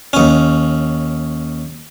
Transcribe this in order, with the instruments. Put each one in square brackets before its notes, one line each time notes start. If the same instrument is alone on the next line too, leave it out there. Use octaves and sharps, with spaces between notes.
[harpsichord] D#2 C#4